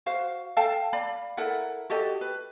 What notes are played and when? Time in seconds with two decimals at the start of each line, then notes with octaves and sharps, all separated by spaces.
0.06 F#4 C5 F5
0.57 A4 F5 G5 A5
0.93 D5 F5 B5
1.37 E4 A4 A#4 F#5
1.90 F#4 G4 A4 D#5
2.21 B4